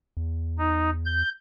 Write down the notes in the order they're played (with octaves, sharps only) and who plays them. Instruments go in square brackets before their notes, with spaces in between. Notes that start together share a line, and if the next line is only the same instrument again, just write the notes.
[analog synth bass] E2
[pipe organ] D#4
G6